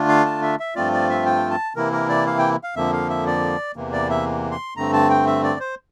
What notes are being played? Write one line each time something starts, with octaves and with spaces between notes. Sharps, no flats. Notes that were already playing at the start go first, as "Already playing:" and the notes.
Already playing: D3 A3 D4 F4
F5
A5
E5
E5
G2 F3 A3 C4 F4 D5
D5
E5
G5
A5
C3 E3 A#3 E4 A#4
A#4
D5
F5
G5
F5
F2 D3 F3 A#3 E5
F5
E5
D5
E2 C3 E3 A#3
D5
E5
C6
G2 D3 A3 C4 A#5
A5
G5
E5
D5
C5